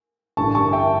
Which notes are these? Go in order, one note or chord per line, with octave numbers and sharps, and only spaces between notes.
A1 G2 D3 A5 C#6
A5 C#6
E5 G5